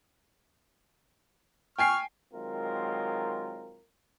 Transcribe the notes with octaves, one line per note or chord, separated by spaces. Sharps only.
G5 G#5 C#6 F6 C7
D#3 F#3 G#3 C4 F4 A#4